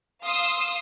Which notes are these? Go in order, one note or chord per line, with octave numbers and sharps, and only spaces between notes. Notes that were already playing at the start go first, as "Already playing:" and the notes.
F5 C6 D#6 E6